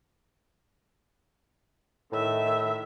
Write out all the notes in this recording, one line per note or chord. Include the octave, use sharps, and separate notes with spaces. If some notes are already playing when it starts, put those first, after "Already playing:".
A2 D#3 E5